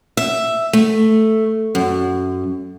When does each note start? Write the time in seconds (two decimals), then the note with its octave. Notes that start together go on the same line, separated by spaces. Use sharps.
0.17 E5
0.73 A3
1.75 F#2